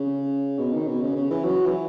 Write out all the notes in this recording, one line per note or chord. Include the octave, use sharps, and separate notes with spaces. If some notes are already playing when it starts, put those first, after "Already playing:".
Already playing: C#3
B2
D#3
B2
C#3
C#3
E3
F#3
E3